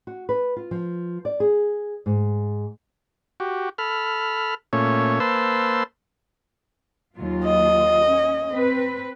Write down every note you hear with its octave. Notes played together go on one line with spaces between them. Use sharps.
F#4
B4
F4
F3
D5
G#4
G#2
F#4 G4
A4 B5 F6
A#2 A3 C#4 C#5
A#3 B4 C5 A5 C6 E6
D#2 F#3 F4
D#5
C#4
C4 B4